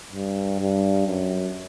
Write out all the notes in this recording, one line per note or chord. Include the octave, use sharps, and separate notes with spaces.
G2
G2
F#2